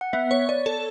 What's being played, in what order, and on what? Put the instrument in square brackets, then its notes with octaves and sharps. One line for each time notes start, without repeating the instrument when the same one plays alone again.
[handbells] F#5
[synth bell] B3 [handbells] E5
[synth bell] C#5
[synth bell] C#5 [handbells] D5
[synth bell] A4